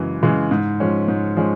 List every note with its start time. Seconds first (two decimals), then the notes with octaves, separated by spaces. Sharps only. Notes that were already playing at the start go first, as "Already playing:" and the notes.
Already playing: F#2 C#3 E3 G#3
0.23 C#3 E3 G#3
0.51 G#2
0.80 F3 G#3 C#4
1.08 G#2
1.37 F3 G#3 C#4